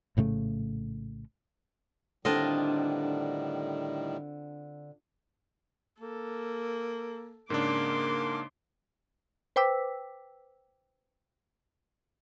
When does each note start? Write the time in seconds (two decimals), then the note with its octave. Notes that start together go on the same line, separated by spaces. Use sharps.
0.17 A#1 A2 C#3 A3
2.25 A2 D3 D#3 G3 C4 D4 F4 D#5
6.00 A#3 A4
7.50 G#2 C#3 A#3 D4 C6 D6
9.56 B4 C5 G5 D6 E6 B6